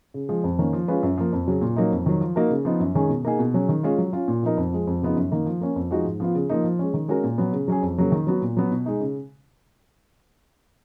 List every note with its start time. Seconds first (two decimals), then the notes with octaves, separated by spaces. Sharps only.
0.14 C#3
0.29 F3 G#3
0.44 F2
0.59 D#3 A#3 C#4
0.73 F3
0.88 G#3 C#4 F4 B4
1.03 F#2
1.18 F3 A#3
1.33 F2
1.47 C#3 F#3 C#4 F#4
1.62 A#2
1.76 F#3 A#3 D#4
1.92 F2
2.06 D#3 F#3
2.21 F3
2.36 A#3 D#4 F#4 A#4
2.50 C#3
2.65 F3 B3 D#4
2.80 F#2
2.95 D#3 G#3 C#4 G#4
3.09 B2
3.25 A#3 D#4 G#4
3.39 B2
3.54 F#3 C#4 G#4
3.69 D#3
3.83 G#3 C#4 F4
3.98 F#3
4.13 C#4 F4
4.28 A#2
4.43 F3 B3 D#4 A#4
4.57 F2
4.72 F3 G#3
4.87 F2
5.02 C#3 F3 B3 D#4
5.16 F#2
5.31 D#3 A#3 D#4
5.46 F3
5.61 A#3 C#4
5.76 F2
5.91 F3 G#3 D#4 F#4
6.05 G#2
6.20 F3 B3 F4
6.35 C#3
6.50 F3 A#3 D#4
6.64 F3
6.79 G#3 C#4
6.94 D#3
7.08 G#3 C#4 F#4 A#4
7.24 A#2
7.38 F#3 B3
7.53 C#3
7.68 F#3 C#4 G#4
7.83 F2
7.98 C#3 F#3 A#3
8.12 D#3
8.27 F#3 B3 F#4
8.42 A#2
8.57 F#3 B3
8.71 B2
8.86 G#3 D#4
9.00 C#3